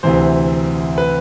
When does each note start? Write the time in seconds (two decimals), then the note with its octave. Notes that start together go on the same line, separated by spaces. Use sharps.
0.03 D2 C3 E3 C5
0.98 B4